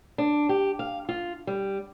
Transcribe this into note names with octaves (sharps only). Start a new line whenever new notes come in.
D4
G4
F5
F4
G3